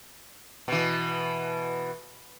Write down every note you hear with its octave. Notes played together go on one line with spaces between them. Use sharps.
B2 E3